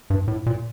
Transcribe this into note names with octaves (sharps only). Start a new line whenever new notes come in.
G2
A2
A#2